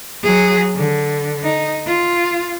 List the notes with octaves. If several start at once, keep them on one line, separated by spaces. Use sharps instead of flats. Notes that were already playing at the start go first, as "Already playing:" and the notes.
F#3 G#4
D3
D#4
F4